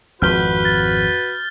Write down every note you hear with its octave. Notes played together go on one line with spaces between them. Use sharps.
G#1 F2 F3 F#4 B4 F6 G6 G7
A6